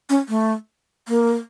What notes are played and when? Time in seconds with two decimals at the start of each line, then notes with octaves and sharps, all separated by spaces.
0.09 C#4
0.29 A3
1.08 A#3